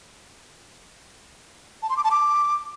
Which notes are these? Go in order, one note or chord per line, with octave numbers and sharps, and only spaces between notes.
A5
C6
D6
A5
D6